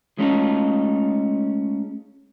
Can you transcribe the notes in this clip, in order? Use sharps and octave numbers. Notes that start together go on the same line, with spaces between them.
G#3 A3 C#4 D#4 F4 A4